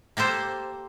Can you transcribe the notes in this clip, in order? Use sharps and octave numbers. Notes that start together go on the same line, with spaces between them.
A#3 G4 A4 C5